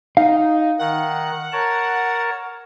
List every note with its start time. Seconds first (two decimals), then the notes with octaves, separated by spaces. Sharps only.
0.17 D#4 F5
0.79 D#3 F#5
1.52 A#4 C#5 A5